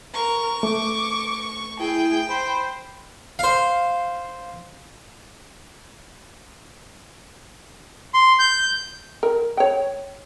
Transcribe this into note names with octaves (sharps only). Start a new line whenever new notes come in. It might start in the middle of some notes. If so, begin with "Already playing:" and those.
A#4 C#6
A3 D6
E4 G#4 G5
C5 B5
C5 F5
C6
G6
A#4
C#5 G5